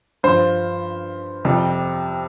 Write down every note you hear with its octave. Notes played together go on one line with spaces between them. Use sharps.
G2 F3 C5
F2 C3 G3